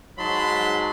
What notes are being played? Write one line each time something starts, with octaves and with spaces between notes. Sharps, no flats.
G#2 F#3 D#4 A5 B5 C6